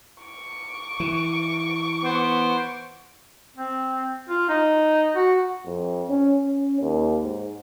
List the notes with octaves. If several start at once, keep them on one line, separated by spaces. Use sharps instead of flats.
C#6 D6
E3
B3 C5
C4
F4
D#4
F#4
F2
C#4
C#4
D#2
G#2